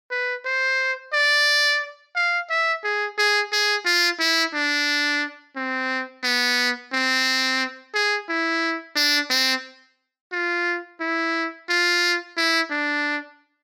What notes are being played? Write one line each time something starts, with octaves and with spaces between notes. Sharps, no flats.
B4
C5
D5
F5
E5
G#4
G#4
G#4
F4
E4
D4
C4
B3
C4
G#4
E4
D4
C4
F4
E4
F4
E4
D4